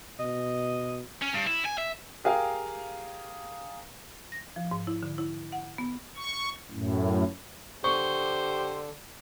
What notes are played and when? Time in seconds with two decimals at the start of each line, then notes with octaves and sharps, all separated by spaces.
0.19 B2 D#5
1.22 C#4
1.35 G2
1.47 E4
1.66 G#5
1.78 E5
2.24 G4 G#4 A#4 F5 G5
4.32 A#6
4.56 F3
4.71 G#2
4.87 E4
5.03 D3
5.18 E4
5.52 F#5
5.78 B3
6.17 C#6
6.71 F#2 A2
7.84 D3 G4 C5 C#6